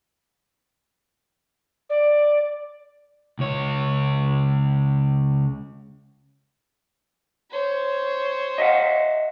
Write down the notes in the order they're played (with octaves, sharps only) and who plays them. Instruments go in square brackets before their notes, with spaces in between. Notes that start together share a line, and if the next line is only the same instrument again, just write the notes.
[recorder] D5
[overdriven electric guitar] C#2 C#5
[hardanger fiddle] C5 C#5
[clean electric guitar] D#5 E5 F#5